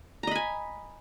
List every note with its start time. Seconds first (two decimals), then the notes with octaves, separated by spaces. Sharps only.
0.23 A#5
0.27 D#5
0.31 B5
0.35 G#5